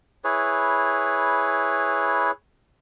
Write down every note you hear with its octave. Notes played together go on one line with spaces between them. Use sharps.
E4 G#4 B4 C#5